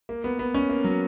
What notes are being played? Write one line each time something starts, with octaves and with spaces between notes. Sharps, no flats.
A#3
B3
B3
C#4
A#3
F#3